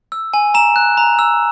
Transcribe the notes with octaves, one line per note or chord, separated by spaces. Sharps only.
E6
G#5
A#5 E7
F#6
A#5
E6